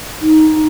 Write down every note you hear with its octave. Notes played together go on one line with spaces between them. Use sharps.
D#4